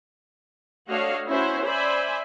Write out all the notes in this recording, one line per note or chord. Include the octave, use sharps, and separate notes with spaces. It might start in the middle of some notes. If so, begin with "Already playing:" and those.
A3 D4 F#4 C#5 D#5 F5
C#4 E4 F#4 C5
C5 D5 E5 G#5 B5